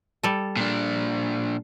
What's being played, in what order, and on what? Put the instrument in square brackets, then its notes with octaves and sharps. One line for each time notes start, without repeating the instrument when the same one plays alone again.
[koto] G3 A4
[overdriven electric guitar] A#2 D4